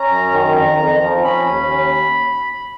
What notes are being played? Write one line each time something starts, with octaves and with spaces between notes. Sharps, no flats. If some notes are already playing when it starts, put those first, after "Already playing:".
Already playing: C#4 A#5
F#2
D#3
F2
F2
F3
C#4 B5
D#2